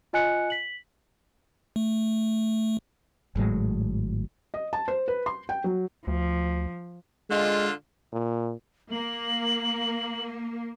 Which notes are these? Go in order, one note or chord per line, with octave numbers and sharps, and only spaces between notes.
F4 D#5 G#5 F#6 C#7
B6 F#7
A3
G#1 A2 F#3 G#3
D#5
A5
C5
B4
C6
G5
F#3
D2 F3
D3 G#3 F4
A#2
A#3 F#7